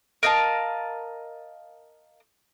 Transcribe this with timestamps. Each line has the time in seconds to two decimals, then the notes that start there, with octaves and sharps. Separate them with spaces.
0.23 A#4 D#5 F5 A5